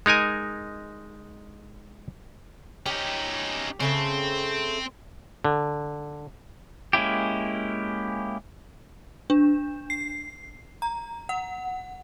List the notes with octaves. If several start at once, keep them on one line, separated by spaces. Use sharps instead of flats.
G#3 D#4 A#4 G#5
C#4 D#4 G4
C#3 A3 C4 A5
D3
G#3 A#3 C#4 E4 G4
D4
C7
A#5
F#5